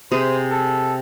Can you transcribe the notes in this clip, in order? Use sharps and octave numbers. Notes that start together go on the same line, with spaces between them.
C3 G#4 C5
A4